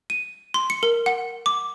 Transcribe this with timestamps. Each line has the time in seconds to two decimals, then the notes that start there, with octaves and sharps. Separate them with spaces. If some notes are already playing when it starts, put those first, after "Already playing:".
0.10 D#7
0.54 C6
0.70 C#7
0.83 A#4
1.06 F#5
1.46 D6